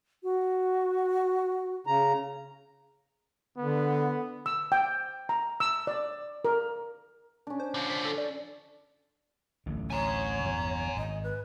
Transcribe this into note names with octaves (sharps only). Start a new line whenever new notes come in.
F#4
C#3 A#5
D3 B3
E6
G5
A#5
E6
D5
A#4
C#4 D4
C5
D3 F3
B6
A4
D5
D1 A1 D3
C#5 G#5 A#5
G1 E2
G#1 D#5
B4